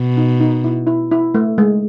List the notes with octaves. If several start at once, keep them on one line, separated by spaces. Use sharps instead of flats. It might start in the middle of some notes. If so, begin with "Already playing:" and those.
Already playing: B2
D#4
D#4
E4
E4
E4
A3
G#3